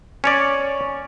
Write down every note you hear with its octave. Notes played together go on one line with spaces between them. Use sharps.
C#4 C#5 D5